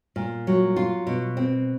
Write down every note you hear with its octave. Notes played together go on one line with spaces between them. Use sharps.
A#2
F#3
F4
B2
C4